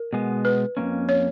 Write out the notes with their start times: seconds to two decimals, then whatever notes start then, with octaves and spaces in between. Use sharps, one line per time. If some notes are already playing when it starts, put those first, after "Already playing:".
Already playing: A#4
0.13 B2 G#3 B3
0.45 B4
0.77 F2 D#3 A#3 C#4
1.09 C#5